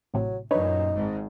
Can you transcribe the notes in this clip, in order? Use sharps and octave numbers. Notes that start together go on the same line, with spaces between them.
A1 A2 C3 F#3
F#2 A#2 D4 D#4 B4 C#5
G#1 G#2